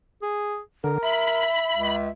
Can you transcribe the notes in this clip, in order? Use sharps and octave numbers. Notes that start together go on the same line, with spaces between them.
G#4
D3 A#4
E5 B5
C#2